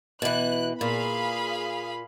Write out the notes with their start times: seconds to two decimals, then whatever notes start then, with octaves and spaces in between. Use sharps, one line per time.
0.22 B2 E3 F#6
0.81 A#2 G#4 F5 B5